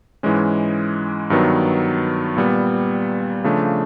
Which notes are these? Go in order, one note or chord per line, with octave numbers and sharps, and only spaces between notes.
G#2 E3 G#3 C#4
G2 D#3 F#3 B3
A#2 G3 B3
C#3 F3 A3 D4